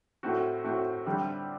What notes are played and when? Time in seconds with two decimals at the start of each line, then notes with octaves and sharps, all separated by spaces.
0.23 A2 A3 C4 F#4
0.64 A2 A3 C4 F#4
1.06 D3 G3 C4 G4